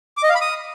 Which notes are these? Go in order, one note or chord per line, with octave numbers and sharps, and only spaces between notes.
D6
D#5
F5
B5
D#6